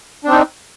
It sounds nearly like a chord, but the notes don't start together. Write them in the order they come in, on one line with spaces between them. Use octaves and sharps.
D4 C4 D#4